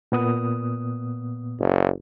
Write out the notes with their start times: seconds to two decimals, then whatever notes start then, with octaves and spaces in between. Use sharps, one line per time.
0.12 A#2 B3 D#6
1.59 F#1